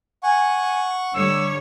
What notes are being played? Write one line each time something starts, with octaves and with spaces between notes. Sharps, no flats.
F#5 G#5 C#6
D3 G3 C#5 E6